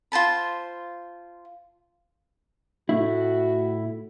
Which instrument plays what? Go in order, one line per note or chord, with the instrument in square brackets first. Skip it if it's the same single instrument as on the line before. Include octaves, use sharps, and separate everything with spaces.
[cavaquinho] F4 C5 A5 B5
[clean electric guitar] A2 A3 E4 [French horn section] F#4